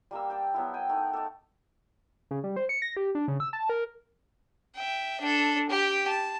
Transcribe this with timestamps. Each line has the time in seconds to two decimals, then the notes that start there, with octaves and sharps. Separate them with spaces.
0.11 G3 A#3 A#5 E6
0.30 G5 A5 A#5
0.54 F#3 B3 E4
0.74 G5 G#5
0.89 A3 D#4
1.13 A4 D5 D#5 A5
2.31 C#3
2.44 G3
2.56 C5
2.69 C#7
2.82 A#6
2.97 G4
3.15 D4
3.28 C#3
3.40 E6
3.53 A5
3.69 A#4
4.75 E5 G5
5.20 D4 A4
5.69 G4 G5
6.08 A5